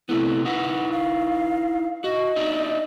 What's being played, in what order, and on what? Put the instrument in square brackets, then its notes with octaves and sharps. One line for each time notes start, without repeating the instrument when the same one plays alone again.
[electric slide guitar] C3 A3 B3 [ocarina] E4
[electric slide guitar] D#4 E4 B4 [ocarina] F#5
[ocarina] F5
[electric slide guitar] F#4 [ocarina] D#5
[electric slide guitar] D4 D#4 E5